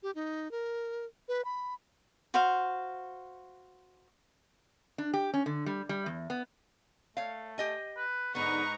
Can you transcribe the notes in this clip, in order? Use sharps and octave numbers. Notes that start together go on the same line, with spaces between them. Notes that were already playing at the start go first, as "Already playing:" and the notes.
G4
D#4
A#4
B4
B5
F#4 C5 F5
D4
G4
C#4
D3
G3
G3
E2
B3
A3 C#5 F5
G4 D#5 G#5
B4
G#2 D3 B3 D#4 B4 A#5 C#6